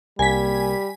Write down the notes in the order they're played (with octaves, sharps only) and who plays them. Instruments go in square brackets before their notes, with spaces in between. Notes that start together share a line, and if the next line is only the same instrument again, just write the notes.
[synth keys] C2 A#3 [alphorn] G3 [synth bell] G#5 B6